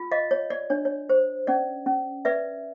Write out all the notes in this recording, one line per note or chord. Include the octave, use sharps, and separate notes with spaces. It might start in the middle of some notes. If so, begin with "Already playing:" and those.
Already playing: F4
D#5 F5
C#5
D5
D4 C#5
C#5
C5
C#4 D5
C#4
B4 D5 E5